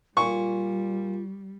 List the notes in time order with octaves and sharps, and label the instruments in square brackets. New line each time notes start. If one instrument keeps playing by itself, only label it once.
[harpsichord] A#2 [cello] G3 [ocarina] F4 [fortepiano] C#6